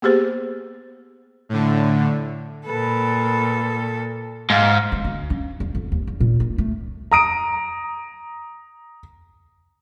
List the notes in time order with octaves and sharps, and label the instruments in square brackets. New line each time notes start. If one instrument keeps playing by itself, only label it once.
[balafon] A#3 B3 G4 G#4 C5
[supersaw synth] A2 D3
[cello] A#2 A4 [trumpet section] B4
[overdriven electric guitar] G#2 [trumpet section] F5
[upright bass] E3
D2
C#4
E2
F2
D#2
E2
A#2
A#3
A3
[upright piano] A#5 D#6 D7